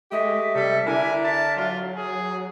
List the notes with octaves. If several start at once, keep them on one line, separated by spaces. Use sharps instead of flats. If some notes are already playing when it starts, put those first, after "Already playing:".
G#3 A3 G4 D#5 E5
C3 G3 A4
D3 D4 E4 A#4 G#5
A5
F#3 F4
G#4